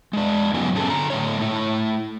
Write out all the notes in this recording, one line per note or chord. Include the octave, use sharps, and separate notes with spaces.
G#3 D4
G2 C#3 F#3 B3 D#4 G#5
C#4 G#4 A4 G#5 A5
D3 A#5
A2 D3 C#5
A3 E4